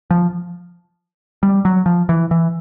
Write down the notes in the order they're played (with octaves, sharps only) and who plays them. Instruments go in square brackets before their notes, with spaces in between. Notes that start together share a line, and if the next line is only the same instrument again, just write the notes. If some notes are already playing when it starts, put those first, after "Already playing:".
[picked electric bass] F3
G3
F#3
F3
E3
E3